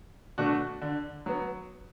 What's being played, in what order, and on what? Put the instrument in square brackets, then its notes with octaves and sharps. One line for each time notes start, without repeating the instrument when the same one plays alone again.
[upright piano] B2 A3 D4 F#4
D3
F#3 B3